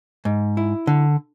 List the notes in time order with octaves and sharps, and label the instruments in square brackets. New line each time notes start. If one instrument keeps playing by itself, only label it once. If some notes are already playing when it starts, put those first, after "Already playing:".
[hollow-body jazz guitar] G#2
E4
D3